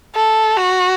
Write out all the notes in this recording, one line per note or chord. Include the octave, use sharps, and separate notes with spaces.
A4
F#4